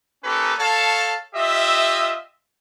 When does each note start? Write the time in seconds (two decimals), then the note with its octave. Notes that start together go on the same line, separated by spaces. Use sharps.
0.24 A#3 C#4 D#4 G4 A4 B4
0.59 A4 C#5 F5 A5
1.34 F4 G4 D#5 E5